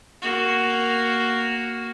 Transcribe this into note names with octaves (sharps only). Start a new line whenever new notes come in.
A#3 F#4